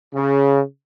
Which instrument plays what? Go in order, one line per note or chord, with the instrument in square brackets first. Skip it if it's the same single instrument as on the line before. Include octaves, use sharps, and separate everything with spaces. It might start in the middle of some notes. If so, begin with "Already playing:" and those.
[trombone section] C#3